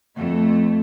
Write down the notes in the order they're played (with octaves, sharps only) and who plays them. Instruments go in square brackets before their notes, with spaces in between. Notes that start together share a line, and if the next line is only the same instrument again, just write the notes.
[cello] F2 [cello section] A3